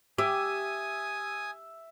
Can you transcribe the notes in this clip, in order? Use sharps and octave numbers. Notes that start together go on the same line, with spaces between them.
G4 E5 G#5 D#6